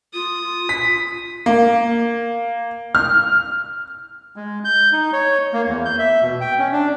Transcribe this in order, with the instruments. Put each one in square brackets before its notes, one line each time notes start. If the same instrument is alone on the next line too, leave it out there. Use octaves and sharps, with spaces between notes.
[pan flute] F4 [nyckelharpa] D#6
[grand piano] B6
[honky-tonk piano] A#3
F6
[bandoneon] G#3
G6
D#4
C#5
A#3
E2
G6
E5
B2
G5
C#4
D4